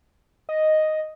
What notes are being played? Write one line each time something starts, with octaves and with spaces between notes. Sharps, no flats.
D#5